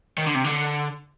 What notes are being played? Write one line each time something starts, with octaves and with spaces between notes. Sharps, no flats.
D#3
D3
C3
D3